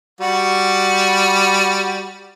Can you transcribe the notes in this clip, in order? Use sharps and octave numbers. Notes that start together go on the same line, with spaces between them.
G3 F#4